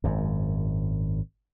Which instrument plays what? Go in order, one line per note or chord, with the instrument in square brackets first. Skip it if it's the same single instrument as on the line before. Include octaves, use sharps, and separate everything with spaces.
[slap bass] G#1 F#2